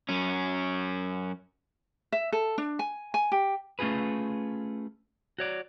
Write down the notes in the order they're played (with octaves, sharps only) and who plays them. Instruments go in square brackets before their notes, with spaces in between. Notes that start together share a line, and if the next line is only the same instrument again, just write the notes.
[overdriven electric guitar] F#2 C#4
[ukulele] E5
A4
D4
G#5
G#5
G4
[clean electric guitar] A3 C#4 F4 G#4 B4
F#4 C#5 D5